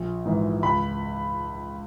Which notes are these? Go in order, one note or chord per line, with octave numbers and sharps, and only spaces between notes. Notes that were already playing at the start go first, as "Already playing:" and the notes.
Already playing: A#1
G#2 E3
C#2 B5